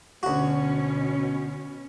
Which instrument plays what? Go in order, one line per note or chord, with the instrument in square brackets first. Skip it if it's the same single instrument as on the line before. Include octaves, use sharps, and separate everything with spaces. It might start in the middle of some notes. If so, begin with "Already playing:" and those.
[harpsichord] D2 F#4 [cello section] B2 C#4